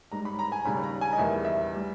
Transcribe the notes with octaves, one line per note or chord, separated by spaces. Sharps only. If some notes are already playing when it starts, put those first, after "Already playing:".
G#2 G3 A#5
B5
A#5
G#5
D#2 C#3 G3 B5
A#5
G#5
D#5
E2 D#3 G3 E5
E5
G3